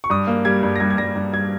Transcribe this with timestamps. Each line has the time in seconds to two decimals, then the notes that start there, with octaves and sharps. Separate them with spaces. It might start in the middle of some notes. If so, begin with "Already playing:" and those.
0.04 C#6
0.10 G2 D#6
0.27 A#3
0.45 G3 G#6
0.63 G2
0.76 A#6
0.80 G2 G#6
0.90 G#6
0.98 G2 A#6
1.16 G2
1.33 G2 G#6